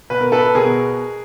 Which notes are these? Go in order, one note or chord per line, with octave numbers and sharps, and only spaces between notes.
B2 B4
A#4
A4 B4
B2 G#4 A#4